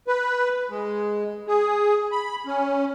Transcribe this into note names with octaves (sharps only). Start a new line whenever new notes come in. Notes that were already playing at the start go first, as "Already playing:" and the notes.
B4
G#3
G#4
B5
C#4